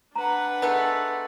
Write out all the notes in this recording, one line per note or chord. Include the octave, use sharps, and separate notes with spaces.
D4 B4 F#5 A#5
G#3 A3 B3